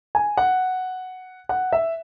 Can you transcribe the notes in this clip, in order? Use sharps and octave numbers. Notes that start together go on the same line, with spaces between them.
G#5
F#5
F#5
E5